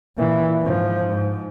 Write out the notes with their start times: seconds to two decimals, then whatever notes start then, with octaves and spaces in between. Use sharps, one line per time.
0.17 A#2 E3
0.61 G#2 F3
1.05 G#2